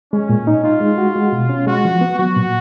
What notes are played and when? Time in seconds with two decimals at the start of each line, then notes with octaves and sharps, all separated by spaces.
0.13 G#3 C#4
0.29 A#2
0.47 D#4
0.64 D#4 F4
0.81 G#3
0.98 F#4
1.16 G#3
1.33 B2
1.50 C#4
1.67 G#3 F#4
1.85 F3
2.01 B3
2.19 F#3 F#4
2.36 A#2